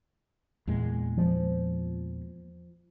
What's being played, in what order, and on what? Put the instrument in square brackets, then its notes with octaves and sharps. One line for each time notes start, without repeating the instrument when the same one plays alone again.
[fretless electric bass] E2 A#2 G#3
[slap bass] F3